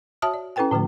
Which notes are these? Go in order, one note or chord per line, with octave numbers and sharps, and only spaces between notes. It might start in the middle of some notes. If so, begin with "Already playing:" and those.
F#4 C#5 E5 A5 D#6 F6
D5
C#4 E4 A4 B4 G5 G#5
A2 D3 F3 A3